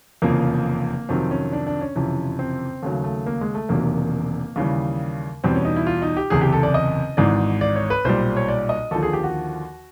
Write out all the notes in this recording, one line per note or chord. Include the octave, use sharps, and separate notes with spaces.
F1 E2 C#3 F3 A#3
F2 C3 D#3 F#3 C4
C#4
D4
D4
C#4
F#1 F2 C3 E3
C4
D#2 C#3 F#3 A3
A3
A#3
G#3
A3
E1 E2 C3 D#3 F#3 A#3
D#2 C#3 E3 G3
E2 B2 G3 C4
C#4
D#4
E4
F4
D#4
G4
F#1 E2 C3 G#4
G4
A4
D5
D#5
G#1 G#2 E3 D5
D5
C#5
B4
B1 A#2 G3 C5
C#5
D5
D#5
D#2 D3 F3 A4
G#4
G4
F#4